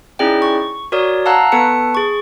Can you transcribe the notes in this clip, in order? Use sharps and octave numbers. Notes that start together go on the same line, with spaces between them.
C#4 D#4 E4 G#4 D5 G5
C#6
F#4 A#4 C#5 D5 D#6
F5 F#5 A5 A#5 E6 F#6
B3 A4 B4 A5 C#7
G#4 C#6